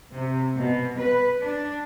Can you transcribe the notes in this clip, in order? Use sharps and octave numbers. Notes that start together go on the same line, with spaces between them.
C3
B2
B4
D4